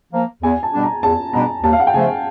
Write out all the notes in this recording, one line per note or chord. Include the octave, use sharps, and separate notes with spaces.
F3 A#3
E2 G#5
A5
B2 G3 B3 D4
A#5
E2 A5
B2 G3 B3 D4 A#5
D#2 A5
F5
F#5
G5
C#3 F3 A3 G#5